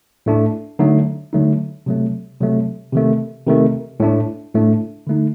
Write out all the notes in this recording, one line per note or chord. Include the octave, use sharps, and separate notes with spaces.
A2 A3 D4
D3 F#3 A3 D#4
D3 F#3 A3 D#4
C3 F#3 A3
C3 F#3 A3
C3 D#3 A3
C3 D#3 A3
A2 A3 D4
A2 A3 D4
D3 A3 D#4